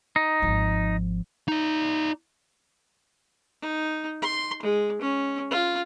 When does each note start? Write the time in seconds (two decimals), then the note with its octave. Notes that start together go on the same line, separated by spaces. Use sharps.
0.16 D#4
0.42 G#1 F3
1.48 D#4 D5
3.62 D#4
4.22 C6
4.62 G#3
5.01 C#4
5.51 F4